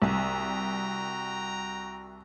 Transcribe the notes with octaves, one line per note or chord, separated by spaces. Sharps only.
C2 F#4 G5 A#5